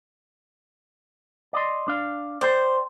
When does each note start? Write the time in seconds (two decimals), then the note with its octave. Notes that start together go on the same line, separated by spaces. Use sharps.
1.53 D5 D#5 C6
1.88 D4 F5
2.41 C5 D5 G5 C6